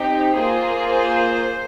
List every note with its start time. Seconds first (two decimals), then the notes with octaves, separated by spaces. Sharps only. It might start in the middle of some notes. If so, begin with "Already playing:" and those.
Already playing: C4 D#4 G4
0.33 A#3 F4 G#4 C5
0.88 C5